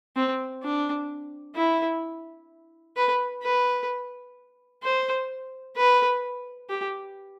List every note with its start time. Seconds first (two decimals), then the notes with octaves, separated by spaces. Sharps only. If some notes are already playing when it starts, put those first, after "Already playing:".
0.16 C4
0.63 D4
1.55 E4
2.96 B4
3.43 B4
4.83 C5
5.76 B4
6.69 G4